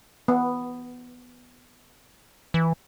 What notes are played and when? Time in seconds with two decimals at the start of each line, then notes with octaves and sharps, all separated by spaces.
0.28 B3
2.54 E3